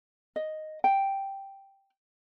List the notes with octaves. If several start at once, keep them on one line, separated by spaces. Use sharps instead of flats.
D#5
G5